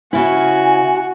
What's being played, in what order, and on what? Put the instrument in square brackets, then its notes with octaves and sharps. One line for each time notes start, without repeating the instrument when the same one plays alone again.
[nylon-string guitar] C#3 E4 [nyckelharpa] F#4 [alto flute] G#5